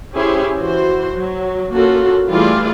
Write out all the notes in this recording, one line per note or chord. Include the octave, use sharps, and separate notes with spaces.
C#4 E4 G4 G#4 C5
E3 F#4 C5
F#3
A#3 C#4 F4 F#4 A4
E3 G3 A3 F4 G#4 D5